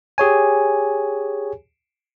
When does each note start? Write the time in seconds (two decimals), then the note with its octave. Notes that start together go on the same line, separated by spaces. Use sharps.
0.18 G4 G#4 C#5 G#5